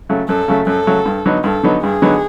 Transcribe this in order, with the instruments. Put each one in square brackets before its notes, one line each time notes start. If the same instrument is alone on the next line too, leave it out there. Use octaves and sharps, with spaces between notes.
[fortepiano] C#3 F#3 A3
[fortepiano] F#2 [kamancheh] A4
[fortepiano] C#3 F#3 A3
[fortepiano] F#2 [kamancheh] A4
[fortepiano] C#3 F#3 A3
G2
D3 F#3 B3 D#4
[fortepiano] G2 [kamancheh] A4
[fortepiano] D3 F#3 B3 D#4
[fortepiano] G2 [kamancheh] G#4
[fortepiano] D3 F#3 B3 D#4